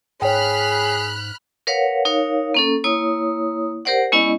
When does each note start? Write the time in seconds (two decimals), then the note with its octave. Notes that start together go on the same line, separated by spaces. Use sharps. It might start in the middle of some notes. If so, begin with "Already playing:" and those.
0.22 G#2 G#4 C#5 G5 B5 F6 F#6
1.67 A#4 B4 C#5 F5 F#5
2.05 D#4 A#4 C#5 F5
2.54 A#3 C#4 A4
2.84 A#3 E4 C#5 D#6
3.85 G4 A#4 C5 D5 F#5
4.12 G#3 B3 C#4 E4 D5 D#5